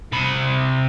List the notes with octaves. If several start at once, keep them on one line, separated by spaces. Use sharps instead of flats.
C3 B5